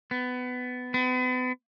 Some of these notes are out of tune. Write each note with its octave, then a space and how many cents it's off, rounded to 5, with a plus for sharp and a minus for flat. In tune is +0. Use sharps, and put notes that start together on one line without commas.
B3 +20
B3 +40